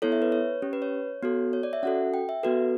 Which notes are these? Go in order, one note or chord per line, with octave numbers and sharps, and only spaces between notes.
B3 E4 A4 C#5
E5
B4
C#5
C#4 G4
B4
C#5
B3 F#4 A4
C#5
D5
E5
C#4 F#4 A4 F#5
G5
E5
B3 F#4 A4 B4